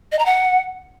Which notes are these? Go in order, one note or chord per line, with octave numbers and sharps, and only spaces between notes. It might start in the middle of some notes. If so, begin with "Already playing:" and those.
D#5
A#5
F#5